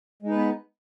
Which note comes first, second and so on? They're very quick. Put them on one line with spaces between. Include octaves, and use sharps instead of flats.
G#3 D#4 B4 B3